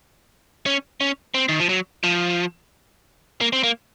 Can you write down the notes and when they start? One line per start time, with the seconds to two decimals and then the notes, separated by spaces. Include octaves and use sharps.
0.66 C#4
1.01 C#4
1.34 C4
1.49 D#3
1.60 F3
1.69 F#3
2.04 F3
3.41 A#3
3.53 C4
3.64 A#3